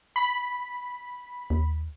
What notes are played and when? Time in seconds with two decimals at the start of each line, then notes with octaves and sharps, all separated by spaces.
0.16 B5
1.50 D#2